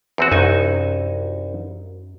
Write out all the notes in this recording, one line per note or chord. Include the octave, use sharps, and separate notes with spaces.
E2 C4 F#4
C2 F#2 D#4 G#5